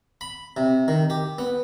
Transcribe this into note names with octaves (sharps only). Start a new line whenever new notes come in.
B5
C3
D#3
G4
B3